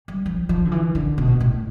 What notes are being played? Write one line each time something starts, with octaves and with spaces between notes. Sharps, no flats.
G3
F3
F3
D3
E3
D3
B2
A2